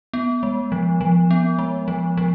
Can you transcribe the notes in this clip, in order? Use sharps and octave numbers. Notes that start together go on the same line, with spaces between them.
B3
G#3
F3
F3
B3
G#3
F3
F3